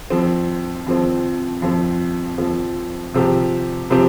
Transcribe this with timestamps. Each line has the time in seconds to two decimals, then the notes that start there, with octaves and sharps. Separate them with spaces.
0.10 F2 F3 C4
0.87 F2 F3 C4
1.62 F2 F3 C4
2.38 F2 F3 C4
3.14 C3 F3 C4 G4
3.90 C3 F3 C4 G4